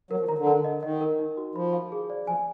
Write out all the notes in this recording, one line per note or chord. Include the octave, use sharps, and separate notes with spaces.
F#3 A#4
F3
D#3 A#5
D3
A#4
D#5
D#3 D#5
A#4
D#4
F#4
F3 B5
F5
G#4
D5
F3 G#5